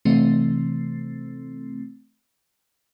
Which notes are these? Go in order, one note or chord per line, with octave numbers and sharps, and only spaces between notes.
C3 E3 A3 C4